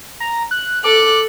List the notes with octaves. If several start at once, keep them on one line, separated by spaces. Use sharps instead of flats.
A#5
F#6
A4 D6 F#6